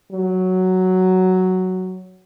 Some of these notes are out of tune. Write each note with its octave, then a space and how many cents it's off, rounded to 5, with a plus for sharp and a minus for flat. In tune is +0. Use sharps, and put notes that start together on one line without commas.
F#3 +5